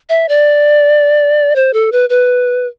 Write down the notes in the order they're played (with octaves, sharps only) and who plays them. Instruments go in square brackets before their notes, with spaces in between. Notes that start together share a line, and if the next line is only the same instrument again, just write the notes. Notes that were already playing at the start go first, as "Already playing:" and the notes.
[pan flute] E5
D5
C5
A4
B4
B4